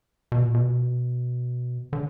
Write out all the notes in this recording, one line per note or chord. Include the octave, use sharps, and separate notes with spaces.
B2
A#2
B2
D3